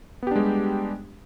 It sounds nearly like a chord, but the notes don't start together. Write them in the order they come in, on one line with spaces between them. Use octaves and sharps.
B3 G4 D4 G#3 G3